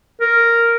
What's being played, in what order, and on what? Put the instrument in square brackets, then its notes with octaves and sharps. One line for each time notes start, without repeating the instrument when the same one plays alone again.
[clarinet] A#4